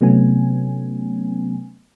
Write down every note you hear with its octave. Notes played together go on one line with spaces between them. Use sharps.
C3 F#3 A3 B3 C#4 G#5